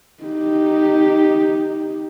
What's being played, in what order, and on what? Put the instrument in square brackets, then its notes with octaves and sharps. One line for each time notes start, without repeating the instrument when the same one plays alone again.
[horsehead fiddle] D#4 G4